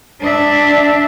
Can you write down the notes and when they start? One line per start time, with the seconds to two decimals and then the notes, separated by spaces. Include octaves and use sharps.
0.21 D4 E5